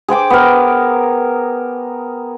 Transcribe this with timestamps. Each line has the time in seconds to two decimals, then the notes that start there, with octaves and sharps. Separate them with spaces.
0.08 G#4 C5 G5 D6
0.30 B3 A#4